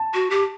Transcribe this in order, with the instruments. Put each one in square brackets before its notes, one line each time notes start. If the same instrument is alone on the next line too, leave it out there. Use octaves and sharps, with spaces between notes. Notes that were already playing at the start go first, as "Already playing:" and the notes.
Already playing: [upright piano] A5
[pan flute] F#4
G4